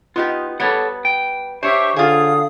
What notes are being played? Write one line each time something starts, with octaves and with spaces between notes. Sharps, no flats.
B3 D#4 F4 G4
G3 B3 A4 C#5 F#5
G5
D4 G4 C5 C#5 E5 C#6
D3 F4 G#4 F5 D#6